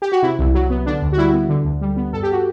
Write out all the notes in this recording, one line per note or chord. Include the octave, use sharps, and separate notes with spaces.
G4
F#4
C3 E4
C2
F#3
B3
D3 D4
D2
F#4
G3 E4
B3
D3
D2
G3
B3
G2 A4
G4
F#4